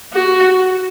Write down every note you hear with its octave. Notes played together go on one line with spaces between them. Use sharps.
F#4